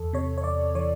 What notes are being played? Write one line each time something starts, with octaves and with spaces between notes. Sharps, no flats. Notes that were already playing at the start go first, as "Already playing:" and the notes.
Already playing: E2 A4
C3 C#5
C#5
E2 D5
E3 C#5